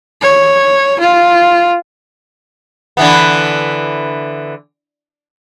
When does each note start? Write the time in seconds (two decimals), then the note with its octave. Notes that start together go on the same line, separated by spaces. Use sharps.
0.22 C#5
1.00 F4
2.97 D3 E3 B3